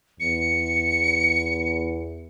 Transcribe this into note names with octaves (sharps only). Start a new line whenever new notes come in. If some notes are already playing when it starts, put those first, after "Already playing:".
E2 C#7